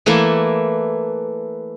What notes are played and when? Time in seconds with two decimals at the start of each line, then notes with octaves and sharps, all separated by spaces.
0.06 E3 A3 A#3 E4